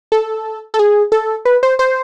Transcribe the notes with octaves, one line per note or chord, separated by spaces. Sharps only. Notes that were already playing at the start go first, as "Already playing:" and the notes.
A4
A4
G#4
A4
B4
C5
C5